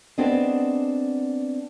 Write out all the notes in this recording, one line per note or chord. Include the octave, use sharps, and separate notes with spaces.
B3 C4 D4 G#4 D#5